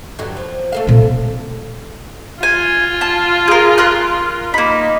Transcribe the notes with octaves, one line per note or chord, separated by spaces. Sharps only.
G2 D3 F#3
F3
A3 A4 F5
A#2 C4
A#3
F4 G#5
A5
G#4 A#4
A#4 C6 F#6
A#3 D#4 B5